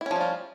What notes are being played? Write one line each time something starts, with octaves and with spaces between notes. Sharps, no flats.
F3 G3 C#4 E4 F4